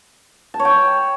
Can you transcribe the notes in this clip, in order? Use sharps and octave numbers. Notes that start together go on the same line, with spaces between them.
A5
C#5
G5